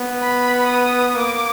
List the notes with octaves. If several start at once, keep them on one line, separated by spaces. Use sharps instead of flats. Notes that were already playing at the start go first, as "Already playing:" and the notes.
Already playing: B3
B5
D#6
A#3 D6